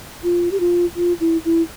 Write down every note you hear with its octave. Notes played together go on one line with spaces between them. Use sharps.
F4
G4
F4
F4
E4
E4